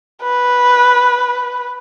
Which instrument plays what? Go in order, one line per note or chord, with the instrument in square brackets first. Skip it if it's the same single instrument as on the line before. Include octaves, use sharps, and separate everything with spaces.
[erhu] B4